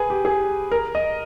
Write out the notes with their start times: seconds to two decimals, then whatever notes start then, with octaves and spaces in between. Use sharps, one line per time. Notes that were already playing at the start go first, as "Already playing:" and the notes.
Already playing: G#4 B4
0.10 G4
0.25 G#4
0.72 A#4
0.95 D#5